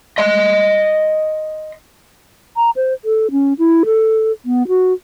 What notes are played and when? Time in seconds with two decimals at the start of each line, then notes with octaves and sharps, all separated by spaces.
0.18 D#5 C6
2.57 A#5
2.76 C5
3.05 A4
3.31 C#4
3.59 E4
3.85 A4
4.45 B3
4.68 F#4